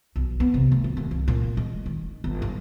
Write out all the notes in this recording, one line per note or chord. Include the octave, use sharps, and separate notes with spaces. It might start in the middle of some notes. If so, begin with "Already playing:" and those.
B1
B3
C3
A3
D1
D#2
C2
A#2
G#3
D#3
G1
G#2